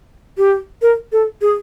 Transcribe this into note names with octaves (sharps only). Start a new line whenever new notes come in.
G4
A#4
A4
G#4